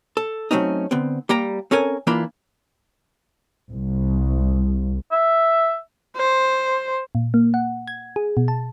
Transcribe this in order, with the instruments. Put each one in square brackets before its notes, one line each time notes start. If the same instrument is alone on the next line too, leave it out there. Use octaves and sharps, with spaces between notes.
[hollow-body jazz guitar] A4
F#3 A3 C4 C#4 D#4
D3 B3 C4
G3 A#3 G5 A#5
C4 C#4 A4 A#4 G#5
E3 A#3 D4 E4 F4 B5
[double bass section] C2
[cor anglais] E5
[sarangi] C5
[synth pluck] A#2
A#3
F#5
G#6
G#4
B2
A5